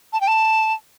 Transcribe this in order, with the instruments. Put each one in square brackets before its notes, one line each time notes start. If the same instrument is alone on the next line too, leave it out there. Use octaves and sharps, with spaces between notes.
[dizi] A5
G5
A5